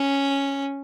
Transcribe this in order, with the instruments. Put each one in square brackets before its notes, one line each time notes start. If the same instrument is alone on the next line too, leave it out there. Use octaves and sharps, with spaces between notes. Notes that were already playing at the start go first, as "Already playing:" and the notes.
Already playing: [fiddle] C#4